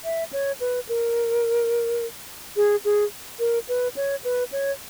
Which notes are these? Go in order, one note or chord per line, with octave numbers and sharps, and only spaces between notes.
E5
C#5
B4
A#4
G#4
G#4
A#4
B4
C#5
B4
C#5